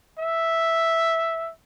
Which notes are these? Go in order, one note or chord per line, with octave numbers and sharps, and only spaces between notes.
E5